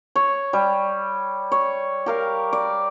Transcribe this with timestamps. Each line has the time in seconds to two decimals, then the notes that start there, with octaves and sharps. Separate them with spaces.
0.16 C#5
0.53 G3
1.52 C#5
2.06 G4 A#4 F5
2.53 D5